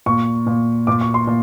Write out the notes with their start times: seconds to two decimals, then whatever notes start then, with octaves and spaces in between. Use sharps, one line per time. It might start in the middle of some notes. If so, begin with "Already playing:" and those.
0.06 A#2 C#6
0.47 A#2
0.87 A#2 D6
1.01 C#6
1.14 C6
1.27 A#2